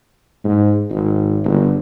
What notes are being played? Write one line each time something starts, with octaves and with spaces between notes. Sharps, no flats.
G#2
G#1
G1